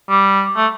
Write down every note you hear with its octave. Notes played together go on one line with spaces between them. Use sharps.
G3
A3